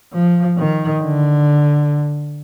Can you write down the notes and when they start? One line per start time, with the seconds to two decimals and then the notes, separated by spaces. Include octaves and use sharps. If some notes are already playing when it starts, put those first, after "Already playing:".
0.13 F3
0.58 D#3
1.03 D3